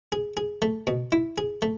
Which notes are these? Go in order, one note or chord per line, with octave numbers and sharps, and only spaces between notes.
G#4
G#4
A3
B2
E4
G#4
A3